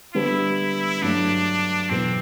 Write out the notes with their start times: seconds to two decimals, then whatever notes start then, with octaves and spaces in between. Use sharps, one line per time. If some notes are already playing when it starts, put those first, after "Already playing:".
0.14 D3 G3 B3 D4 E4
1.02 G2 F#3 A3 D4
1.90 E2 B2 F#3 B3 C4 E4